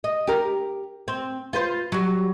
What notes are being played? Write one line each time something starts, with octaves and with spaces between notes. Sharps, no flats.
D#5
G4 A#4
C4
F4 B4 C5
F#3 G3